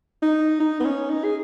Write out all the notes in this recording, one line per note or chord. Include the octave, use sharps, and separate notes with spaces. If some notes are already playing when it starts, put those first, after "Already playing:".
D#4
D#4
B3
C#4
D#4
G#4